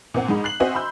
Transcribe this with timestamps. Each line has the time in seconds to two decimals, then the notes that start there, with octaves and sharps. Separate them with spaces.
0.14 A#2 C4 F#5
0.28 G#2 G#3 D#4 B5
0.44 F#6 C7 F#7
0.60 C4 F#4 C5 D#5 E5 G#5
0.74 B5 C6 E6 G6